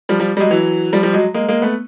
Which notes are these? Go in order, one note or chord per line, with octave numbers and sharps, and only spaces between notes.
F3 G3
F3 G3
G3
F#3 G#3
E3 F#3
F3 G3
F3 G3
F#3 G#3
G#3 A#3
G#3 A#3
A3 B3